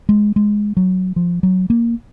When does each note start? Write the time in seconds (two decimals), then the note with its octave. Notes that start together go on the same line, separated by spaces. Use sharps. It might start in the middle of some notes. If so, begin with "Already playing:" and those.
0.09 G#3
0.36 G#3
0.77 F#3
1.16 F3
1.43 F#3
1.70 A#3